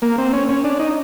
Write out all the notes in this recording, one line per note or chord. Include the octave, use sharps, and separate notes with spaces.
A#3
C4
C#4
C#4
D4
D#4